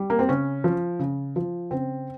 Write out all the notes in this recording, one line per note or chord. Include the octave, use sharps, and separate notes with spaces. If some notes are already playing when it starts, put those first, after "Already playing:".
Already playing: G3
A#3
C4
C#3 C#4
F3
C#3
F3
C#3 C4